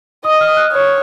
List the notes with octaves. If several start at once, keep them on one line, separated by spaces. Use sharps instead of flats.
D#5 D#6
F6
F#6
C#5